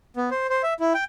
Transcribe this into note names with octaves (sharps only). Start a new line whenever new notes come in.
B3
C5
C5
E5
E4
G5